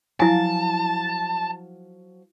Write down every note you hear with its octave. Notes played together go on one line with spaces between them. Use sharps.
F3 F#3 E4 F5 G#5 A5